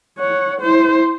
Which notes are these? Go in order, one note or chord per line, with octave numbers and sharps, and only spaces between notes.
C#5 F#5
E4 C5